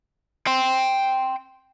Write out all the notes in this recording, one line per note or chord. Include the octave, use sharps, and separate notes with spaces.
G5 C6